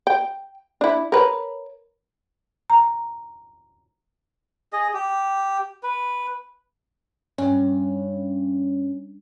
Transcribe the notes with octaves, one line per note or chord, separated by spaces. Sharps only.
G5
D4 E4
A#4 B4 C#5
A#5
G#4 D#5
G4
B4
G2 C#4